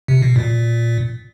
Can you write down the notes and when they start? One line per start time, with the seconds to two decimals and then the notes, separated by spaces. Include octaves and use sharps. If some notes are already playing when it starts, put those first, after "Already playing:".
0.08 C3
0.22 B2
0.36 A#2